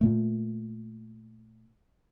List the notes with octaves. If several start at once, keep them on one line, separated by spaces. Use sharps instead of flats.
A#2 A3